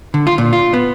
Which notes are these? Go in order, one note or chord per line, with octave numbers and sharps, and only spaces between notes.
D3
F4
A#2
F4
B3